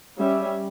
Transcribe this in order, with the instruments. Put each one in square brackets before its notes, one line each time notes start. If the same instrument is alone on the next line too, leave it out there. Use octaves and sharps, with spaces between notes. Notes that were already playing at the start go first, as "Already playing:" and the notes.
[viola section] G3 C#4 E5